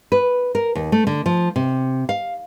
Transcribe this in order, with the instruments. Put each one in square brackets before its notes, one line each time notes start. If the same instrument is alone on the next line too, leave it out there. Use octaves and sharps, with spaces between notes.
[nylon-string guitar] B4
A#4
D#2
A3
D3
F3
C3
F5